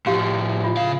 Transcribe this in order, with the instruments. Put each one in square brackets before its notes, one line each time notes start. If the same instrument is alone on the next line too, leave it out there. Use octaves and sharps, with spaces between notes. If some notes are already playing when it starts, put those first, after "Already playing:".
[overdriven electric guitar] A2 F3 [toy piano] F#4 G4 F5
[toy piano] F4
[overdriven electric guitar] C#3 F5